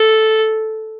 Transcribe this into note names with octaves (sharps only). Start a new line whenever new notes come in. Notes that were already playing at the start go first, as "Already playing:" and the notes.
Already playing: A4